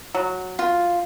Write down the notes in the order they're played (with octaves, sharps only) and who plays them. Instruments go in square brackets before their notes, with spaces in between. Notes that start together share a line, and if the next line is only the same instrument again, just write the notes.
[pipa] F#3
[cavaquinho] F4